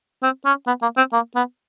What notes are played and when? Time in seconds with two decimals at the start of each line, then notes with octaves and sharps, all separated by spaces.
0.23 C4
0.45 C#4
0.67 B3
0.82 A#3
0.97 C4
1.13 A#3
1.36 B3